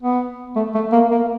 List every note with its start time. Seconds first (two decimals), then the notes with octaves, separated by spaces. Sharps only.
0.02 B3
0.56 A3
0.74 A3
0.92 A#3
1.11 A#3